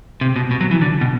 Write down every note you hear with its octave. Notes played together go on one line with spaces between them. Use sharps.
C3
B2
B2
F#3
E3
D3
B2